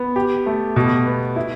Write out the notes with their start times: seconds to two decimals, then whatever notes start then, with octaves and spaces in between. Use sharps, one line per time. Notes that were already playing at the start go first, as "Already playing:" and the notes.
Already playing: B3
0.16 G4
0.46 A3
0.76 B2
1.06 B3
1.36 E4